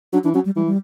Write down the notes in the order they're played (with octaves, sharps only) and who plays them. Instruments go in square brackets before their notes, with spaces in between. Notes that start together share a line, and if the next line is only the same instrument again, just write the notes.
[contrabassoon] F#3 [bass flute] D4
[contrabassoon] E3 [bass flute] D4
[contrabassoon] F#3 [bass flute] C#4
[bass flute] G3
[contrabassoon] E3 [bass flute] G3
[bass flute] G3